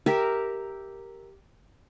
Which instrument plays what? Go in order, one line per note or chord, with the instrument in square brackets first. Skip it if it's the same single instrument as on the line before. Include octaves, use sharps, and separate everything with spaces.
[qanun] G4 A#4 E5